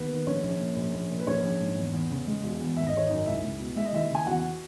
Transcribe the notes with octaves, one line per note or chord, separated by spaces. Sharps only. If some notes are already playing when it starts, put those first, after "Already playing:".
Already playing: D#2 B3 B4
D#3
A#1 C#4 C#5
A#1
A#2
A#1
A#1
A#2
B4
A#1 C#4 C#5
A#1
G#2
E2
E2
C#3
G#3
E1
E2
G#1 E5
D#5
G#1 C#5
F#2 D#4 D#5
C#2 E4 E5
C#2
B2
G#3 E5
D#5
D#2 E4 E5
C#3 G#5
E2 F#4 F#5